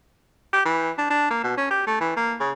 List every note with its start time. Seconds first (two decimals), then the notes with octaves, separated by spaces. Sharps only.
0.53 G4
0.65 E3
0.98 D4
1.10 D4
1.31 A#3
1.44 B2
1.57 C#4
1.71 G4
1.87 A3
2.01 E3
2.17 A#3
2.40 C#3